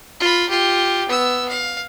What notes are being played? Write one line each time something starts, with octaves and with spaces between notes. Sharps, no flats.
F4 B5
F4 G4
B3 E6
F5